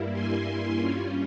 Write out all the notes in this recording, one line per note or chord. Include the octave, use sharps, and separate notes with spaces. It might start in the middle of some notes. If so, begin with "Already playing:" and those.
Already playing: G2 G3 A#3 E4
G#5 C6
G2 G3 C#4 F4